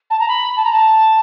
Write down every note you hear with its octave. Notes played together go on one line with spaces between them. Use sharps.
A5
A#5
B5
A5
A#5
A5